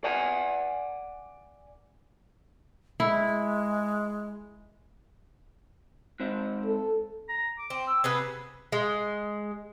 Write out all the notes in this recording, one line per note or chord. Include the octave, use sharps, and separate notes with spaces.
D5 F#5 G#5
G#3 E4
G#2 C4
A4
A#5
D6
C4
E6
C3 B3 G#4 B4
G#3